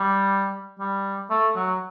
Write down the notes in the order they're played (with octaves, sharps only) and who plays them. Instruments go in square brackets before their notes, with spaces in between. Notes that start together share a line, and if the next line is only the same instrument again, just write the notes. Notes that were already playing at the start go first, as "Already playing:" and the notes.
Already playing: [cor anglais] G3
G3
A3
F#3